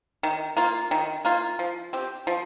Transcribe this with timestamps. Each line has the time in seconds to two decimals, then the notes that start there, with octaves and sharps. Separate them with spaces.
0.23 D#3
0.57 A#3 F4
0.91 D#3
1.25 A#3 F4
1.59 F3
1.93 C4 G4
2.27 F3